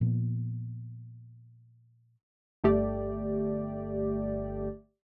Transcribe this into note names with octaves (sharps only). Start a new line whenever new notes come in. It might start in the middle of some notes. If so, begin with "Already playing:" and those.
A#2 F3 B3
G1 A3 G4 D5